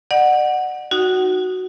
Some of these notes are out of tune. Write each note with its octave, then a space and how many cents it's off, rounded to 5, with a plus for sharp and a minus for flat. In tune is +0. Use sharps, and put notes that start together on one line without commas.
D5 +40 F#5 +0
D#4 +0 F#4 +0 F#5 +35